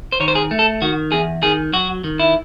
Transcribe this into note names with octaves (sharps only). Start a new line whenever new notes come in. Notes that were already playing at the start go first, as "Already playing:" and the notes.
C5
D#3 C#5
C5
G#4
A3
A4
D#3 F#4
E2 G#4
D#3 G#4
F#3 F#4
D#3
E4